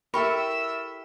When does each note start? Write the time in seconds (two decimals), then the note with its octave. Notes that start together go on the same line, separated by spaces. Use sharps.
0.14 E4 G4 A4 A#4 E5 B5 C#6